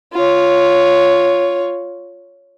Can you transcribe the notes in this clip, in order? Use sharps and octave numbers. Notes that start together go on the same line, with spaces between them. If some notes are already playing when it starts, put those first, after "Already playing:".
F4 C#5